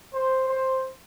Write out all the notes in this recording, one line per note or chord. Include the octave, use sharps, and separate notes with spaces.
C5
C5